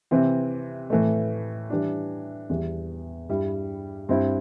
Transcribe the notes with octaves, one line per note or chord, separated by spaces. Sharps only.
C3 E3 C4
A2 E3 A3
E3 G3 D4
E2 E3 G3
G2 G3 E4
G2 G3 C4 E4